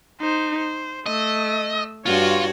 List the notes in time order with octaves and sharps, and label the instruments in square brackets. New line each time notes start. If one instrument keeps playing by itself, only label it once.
[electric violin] D#4 C5
C5
[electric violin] A3 E6 [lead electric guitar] D#5
[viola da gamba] G2 F#4 [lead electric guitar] F4 [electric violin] C#5